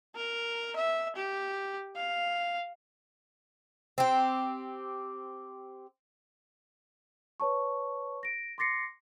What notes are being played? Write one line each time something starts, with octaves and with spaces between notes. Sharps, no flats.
A#4
E5
G4
F5
C4 G4
B4 C#5 A5 C#6
A#6 D7
C6 D6 A6 A#6 C7 C#7